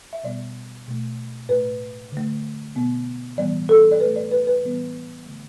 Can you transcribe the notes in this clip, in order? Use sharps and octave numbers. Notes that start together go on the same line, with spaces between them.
E5
B2 G3 B3 D5
B2 A3
A2 A3 B4
D3 A3
B2 B3
A2 E3 G3 B3 D5
A4
D5
A2 A3 B4
D5
B4
B4
A2 E3 G3 B3
D3 A3